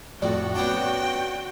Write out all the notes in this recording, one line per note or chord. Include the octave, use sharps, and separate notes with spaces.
F2 A2 F#4 D5
B3 C#4 D4 G5